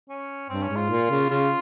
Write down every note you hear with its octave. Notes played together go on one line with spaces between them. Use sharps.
C#4
G2 C4
C#4
G#2
F4
A#2
C#3
C#3 F4